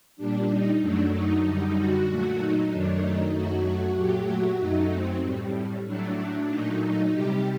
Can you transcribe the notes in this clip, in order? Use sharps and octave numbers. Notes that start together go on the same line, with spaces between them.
A#2 G3 D4
D#4
F#2 F#3 A3 D4
D#4
F#2 D3 G3
F#4
A#2 F#3 A3
D#4
F#2 D#3 F#3 A3 D4
D#4
F#2 F#3 A3 F#4
F#4
A#2 F#3 A3 G4
F#4
F#2 F#3 A3 D#4
C4
A2 G3
A2 F#3 A3 D4
A#2 F#3 A3 D#4
C3 G3 G4